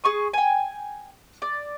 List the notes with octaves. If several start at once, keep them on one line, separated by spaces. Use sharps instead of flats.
G#4 C#6 D#6
G5 G#5
D5